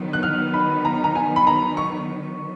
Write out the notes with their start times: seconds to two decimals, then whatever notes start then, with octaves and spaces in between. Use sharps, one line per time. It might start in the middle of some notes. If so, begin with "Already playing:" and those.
Already playing: D#3 F#3 B3
0.13 F#6
0.23 F6
0.54 B5
0.85 A#5
1.04 A#5
1.15 G#5
1.36 B5
1.47 A#5
1.77 C#6